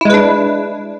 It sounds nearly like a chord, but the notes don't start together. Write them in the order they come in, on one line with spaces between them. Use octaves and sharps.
E4 G#3 B4 D4